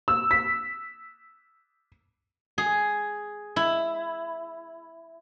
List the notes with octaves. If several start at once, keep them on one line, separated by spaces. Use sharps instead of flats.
E6
B6
G#4
E4